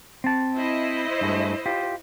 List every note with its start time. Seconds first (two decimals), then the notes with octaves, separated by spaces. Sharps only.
0.24 C4 A5
0.55 E4 C5 D#5
1.21 G2 G#3 A3
1.66 F4 G4